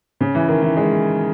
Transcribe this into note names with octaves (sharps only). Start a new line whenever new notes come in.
C#3
E3
D#3
E3
G#3